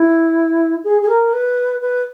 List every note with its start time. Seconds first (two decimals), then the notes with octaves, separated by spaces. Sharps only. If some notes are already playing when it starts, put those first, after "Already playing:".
Already playing: E4
0.84 G#4
1.01 G#4
1.08 A#4
1.33 B4
1.80 B4